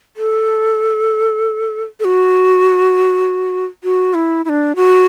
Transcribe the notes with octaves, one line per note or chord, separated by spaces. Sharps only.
A4
A4
F#4
F#4
E4
E4
D4
F#4